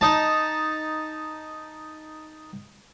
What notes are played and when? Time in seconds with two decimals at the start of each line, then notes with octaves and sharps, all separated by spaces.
0.01 D#4 A5